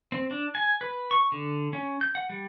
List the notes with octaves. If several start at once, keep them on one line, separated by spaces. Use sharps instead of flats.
C4
D4
G#5
B4
C#6
D3
C#4
G6
F#5
G3